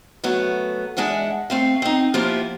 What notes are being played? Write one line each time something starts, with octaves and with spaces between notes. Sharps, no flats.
F#3 A3 B3
E2 G#3 D4 E5 F#5
A3 C4 F5
C4 D#4
F3 A#3 B3 E4 F4 G4